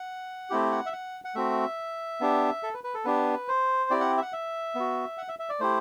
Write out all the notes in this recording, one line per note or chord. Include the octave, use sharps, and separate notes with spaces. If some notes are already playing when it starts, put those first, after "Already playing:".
Already playing: F#5
A3 C4 E4 G4
F#5
E5
F#5
F#5
A3 C4 F#4 E5
B3 D4 G4
A4
B4
B4
A4
B3 D4 G4 B4
C5
C4 E4 G4 D5
F#5
E5
F#5
E5
B3
F#4
F#5
E5
E5
D5
A3 E4 G4 C5